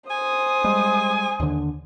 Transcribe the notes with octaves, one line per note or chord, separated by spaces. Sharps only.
C5 G#5 D#6
G3 G#3
D#2 D3